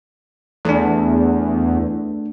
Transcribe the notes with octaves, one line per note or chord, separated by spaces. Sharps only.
E2 A3 D4